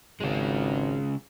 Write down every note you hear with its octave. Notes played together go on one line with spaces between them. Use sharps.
G#1 C#3 G#3